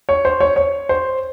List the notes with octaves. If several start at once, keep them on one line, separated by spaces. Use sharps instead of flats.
C#5
C5
C#5
C#5
C5